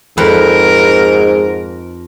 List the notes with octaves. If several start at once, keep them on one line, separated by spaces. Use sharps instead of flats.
F2 G#2 A#4 B4